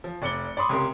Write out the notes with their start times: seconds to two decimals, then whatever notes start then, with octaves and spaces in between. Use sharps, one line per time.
0.04 F3
0.22 F1 D5 C#7 G7
0.57 D5 B5 C6 D#6
0.69 C#2 C3 C#4 A#4 C6